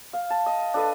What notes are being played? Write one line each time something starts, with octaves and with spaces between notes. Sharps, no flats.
F5
A5
D#5
D4 A4 B4 D#5